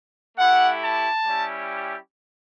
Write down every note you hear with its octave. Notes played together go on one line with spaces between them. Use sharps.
A3 E4 G4 F#5
A5
G3 C#4 E4 G4